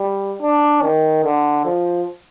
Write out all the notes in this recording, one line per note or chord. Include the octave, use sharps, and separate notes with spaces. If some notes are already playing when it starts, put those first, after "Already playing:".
Already playing: G3
D4
D#3
D3
F3